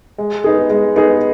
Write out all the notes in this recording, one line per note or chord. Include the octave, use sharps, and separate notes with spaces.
G#3
B3 D#4 G#4
G#3
B3 D#4 G#4